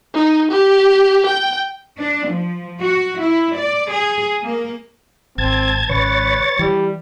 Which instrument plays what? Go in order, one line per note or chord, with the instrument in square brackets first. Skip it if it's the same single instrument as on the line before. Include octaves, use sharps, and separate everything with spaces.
[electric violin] D#4
G4
G5
[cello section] D4
F3
F#4
E4
D5
G#4
A#3
[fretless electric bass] G#1 [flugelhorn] C4 [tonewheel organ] A5 G#6
[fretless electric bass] G#1 C#3 [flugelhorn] B4 [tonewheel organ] C#5 A6
[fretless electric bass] E3 [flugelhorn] G3